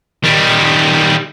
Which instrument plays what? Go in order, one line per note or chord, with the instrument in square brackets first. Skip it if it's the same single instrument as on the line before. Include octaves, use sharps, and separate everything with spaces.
[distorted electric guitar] D#3 G3